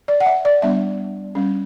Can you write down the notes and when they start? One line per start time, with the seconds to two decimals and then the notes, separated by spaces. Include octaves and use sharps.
0.08 D5
0.20 F#5
0.26 E5
0.45 D5
0.62 G3 B3 D4 E5
1.35 G3 C#4